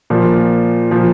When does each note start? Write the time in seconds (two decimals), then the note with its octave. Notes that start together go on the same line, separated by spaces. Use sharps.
0.10 A#2 F3
0.91 A#2 F3